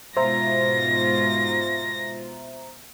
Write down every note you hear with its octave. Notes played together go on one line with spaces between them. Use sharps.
G#2 B2 F4 C5 E5 A#5 A#6